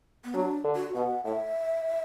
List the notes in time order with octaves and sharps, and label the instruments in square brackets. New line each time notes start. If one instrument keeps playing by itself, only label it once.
[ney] B3
[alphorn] F#3 [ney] D4
[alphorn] D3
[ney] F#4
[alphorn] B2 [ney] F#5
[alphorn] A2 [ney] E5